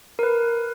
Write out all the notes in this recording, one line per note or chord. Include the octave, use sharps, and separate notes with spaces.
A#4
B4